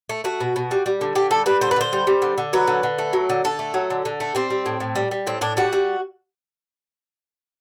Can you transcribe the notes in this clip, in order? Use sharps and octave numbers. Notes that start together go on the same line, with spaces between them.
A3
A3 F#4
B2
B2
G3
G3
D3
D3 G4
G3 A4
G3 B4
D3 C5
B4
D3 C5
G3
G3
D3
D3
F#3 B4
D3
D3
A3
F#3
D3
D3 A4
A3
F#3
D3
D3
A3
G3 C4
G3
A2
A2
G3
G3
A2 C4
A2 D4
G3 F#4
G3